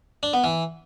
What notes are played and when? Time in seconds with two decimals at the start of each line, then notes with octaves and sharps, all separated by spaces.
0.23 D4
0.33 B3
0.44 E3